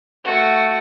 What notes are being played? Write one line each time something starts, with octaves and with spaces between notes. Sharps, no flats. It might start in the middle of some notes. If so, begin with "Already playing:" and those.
A3 F#4 C#7